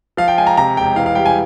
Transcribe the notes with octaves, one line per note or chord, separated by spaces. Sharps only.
F3 F5
G5
G#3 G#5
A#5
C3 A#5
E1 G5
E3 F5
F5
G3 G5
G#5